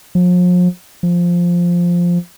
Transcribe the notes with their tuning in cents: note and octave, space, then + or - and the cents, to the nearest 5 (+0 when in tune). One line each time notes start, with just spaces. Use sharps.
F3 +40
F3 +0